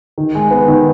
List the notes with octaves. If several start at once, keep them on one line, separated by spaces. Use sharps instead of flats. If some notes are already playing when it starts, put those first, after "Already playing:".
D#3
G#3
B3
D#3